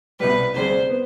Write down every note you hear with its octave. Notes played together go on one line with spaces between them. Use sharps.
C2 B2 G3 B4
D2 C3 G3 D4 G#4 C5
B3